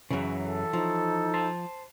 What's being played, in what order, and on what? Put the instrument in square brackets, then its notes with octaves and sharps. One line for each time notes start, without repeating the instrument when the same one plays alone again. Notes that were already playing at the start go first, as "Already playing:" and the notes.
[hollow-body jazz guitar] F#2 C#3 [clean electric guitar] E3 F#3
[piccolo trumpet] A4
[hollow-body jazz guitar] F3 [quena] D#4
[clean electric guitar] C5 A5